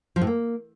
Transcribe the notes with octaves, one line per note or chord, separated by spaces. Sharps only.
F3
A2
A#3